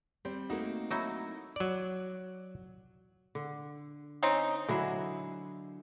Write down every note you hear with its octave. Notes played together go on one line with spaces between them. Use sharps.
G3 C4
A3 A#3 D#4 F#4
F#3 D#4 E4 A#6
F#3 D5
D3
C4 C#4 D#4
D3 F#3 G#3 E4